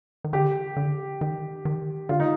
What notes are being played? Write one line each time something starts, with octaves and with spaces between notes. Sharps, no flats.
D#3
D3 G4
D3
D#3
D#3
D3 F4
D#4